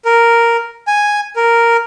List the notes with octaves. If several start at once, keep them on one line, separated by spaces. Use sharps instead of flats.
A#4
G#5
A#4